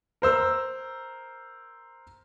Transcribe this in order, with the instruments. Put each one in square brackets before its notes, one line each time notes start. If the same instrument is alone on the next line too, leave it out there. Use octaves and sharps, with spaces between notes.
[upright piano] A#4 C5 E6